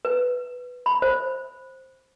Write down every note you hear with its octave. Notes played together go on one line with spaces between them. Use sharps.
B4
B5
C5